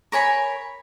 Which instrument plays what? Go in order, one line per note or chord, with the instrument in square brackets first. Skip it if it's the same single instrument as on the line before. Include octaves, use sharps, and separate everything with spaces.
[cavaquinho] A#4 C#5 G#5 B5